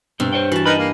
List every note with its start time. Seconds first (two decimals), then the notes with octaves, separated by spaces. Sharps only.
0.20 G2 B2 C4
0.33 C5 C#5 G5
0.52 E3 F#4 A5
0.66 D#4 A#4 B4 D#5 B5
0.78 A#3